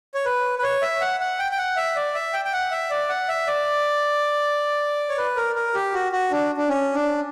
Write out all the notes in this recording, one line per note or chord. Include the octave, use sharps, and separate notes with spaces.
C#5
B4
B4
C#5
E5
F#5
F#5
G5
G5
F#5
E5
D5
E5
G5
G5
F#5
E5
D5
F#5
E5
D5
C#5
B4
A#4
A#4
G4
F#4
F#4
D4
D4
C#4
D4